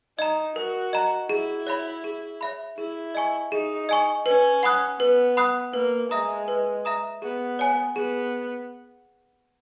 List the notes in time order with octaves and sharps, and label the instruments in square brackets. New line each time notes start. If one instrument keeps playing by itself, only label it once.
[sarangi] D#4 [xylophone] D#5 A#5
[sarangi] F#4 [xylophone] A#4
[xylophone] D#5 A#5
[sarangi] E4 [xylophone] G#4
[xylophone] C#5 E5 B5
G#4
C#5 E5 B5
[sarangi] E4 [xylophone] G#4
[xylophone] D#5 G#5 C#6
[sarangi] D#4 [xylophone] G#4
[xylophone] D#5 G#5 C#6
[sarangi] C#4 [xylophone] B4
[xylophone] F#5 B5 D#6 F#6
[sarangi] B3 [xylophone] B4
[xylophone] F#5 B5 D#6 F#6
[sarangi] A#3 [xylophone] B4
[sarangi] G#3 [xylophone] E5 A#5 D#6
[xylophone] B4
E5 A#5 D#6
[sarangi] B3 [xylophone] G#4
[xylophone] C#5 G#5
[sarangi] B3 [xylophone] G#4